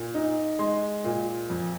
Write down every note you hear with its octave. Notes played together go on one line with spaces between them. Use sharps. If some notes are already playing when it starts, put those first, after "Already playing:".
Already playing: A#2
D#4
G#3 C6
A#2
F2